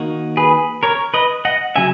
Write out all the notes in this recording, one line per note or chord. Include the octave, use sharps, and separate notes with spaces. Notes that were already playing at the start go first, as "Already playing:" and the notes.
Already playing: D#2 D#3 A#3 D#4 F#4
G#4 B4
A#4 C#5
B4 D#5
D#5 F#5
C#3 F#3 E5 G#5